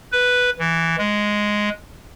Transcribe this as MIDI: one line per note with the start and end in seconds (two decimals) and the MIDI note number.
0.12 0.50 71
0.59 0.96 52
0.98 1.69 56